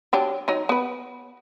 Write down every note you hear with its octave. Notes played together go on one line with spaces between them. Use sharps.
F#3 D4 G4
F#3 D#4
B3 B4